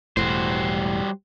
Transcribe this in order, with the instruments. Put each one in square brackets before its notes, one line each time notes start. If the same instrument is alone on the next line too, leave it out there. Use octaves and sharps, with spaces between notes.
[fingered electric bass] E1 A2 [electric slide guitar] G3 F#4 C5